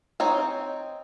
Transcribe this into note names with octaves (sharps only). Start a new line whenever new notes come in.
C4 D#4 C#5 G#5